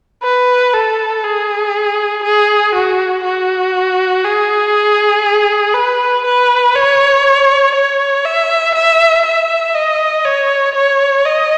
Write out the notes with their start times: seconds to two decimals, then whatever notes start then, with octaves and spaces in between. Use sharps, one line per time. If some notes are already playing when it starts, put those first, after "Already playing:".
0.23 B4
0.74 A4
1.24 G#4
2.23 G#4
2.74 F#4
3.24 F#4
4.24 G#4
5.74 B4
6.25 B4
6.75 C#5
7.75 C#5
8.25 E5
8.75 E5
9.25 E5
9.75 D#5
10.25 C#5
10.75 C#5
11.26 D#5